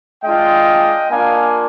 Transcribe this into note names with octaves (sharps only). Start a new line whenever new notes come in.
G#3 D4 F4 D#5 G5
A#3 D4 F4 F5 G#5